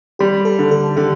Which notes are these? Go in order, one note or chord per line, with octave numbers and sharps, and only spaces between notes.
G3 G4
A4
D3
A4
D3 G4